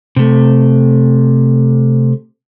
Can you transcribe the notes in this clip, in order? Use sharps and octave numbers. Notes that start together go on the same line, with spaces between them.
C3 A3